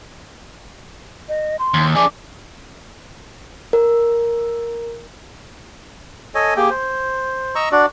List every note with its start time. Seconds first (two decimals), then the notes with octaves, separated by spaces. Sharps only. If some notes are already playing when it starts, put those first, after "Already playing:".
1.29 D#5
1.59 C6
1.74 D#2
1.96 D4 G#4 D6
3.73 A#4
6.35 A4 C#5 D#5 G#5
6.57 A#3 G4 G#4 G5
6.70 C5
7.55 D#5 A#5 C#6 E6
7.72 D4 F#4 D5